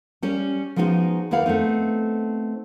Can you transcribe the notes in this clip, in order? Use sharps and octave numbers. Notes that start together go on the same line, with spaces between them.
G3 C#4 C#5
F3 G#3 B3 D#4 F4 F#4
D#2 D#3 E4 B4 F5 F#5
A3 B3 C4 D#4